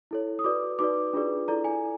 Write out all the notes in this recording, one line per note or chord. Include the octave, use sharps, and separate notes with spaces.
E4 A4 C#5
D#6
F#4 B4 D5 D6
D#4 F#4 B4 D5 D6
D4 F4 G#4 B4 D5
E4 A4 D5 A#5
G#5